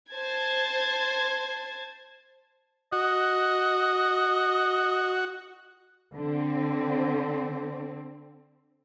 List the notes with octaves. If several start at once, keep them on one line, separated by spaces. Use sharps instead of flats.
C5 A5 G#6
F#4 D#5
D3 C4